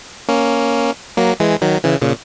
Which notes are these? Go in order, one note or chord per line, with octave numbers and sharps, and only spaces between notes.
A#3 C#4
F#3 A#3
E3 G#3
D#3 F#3
C#3 E3
A#2 C#3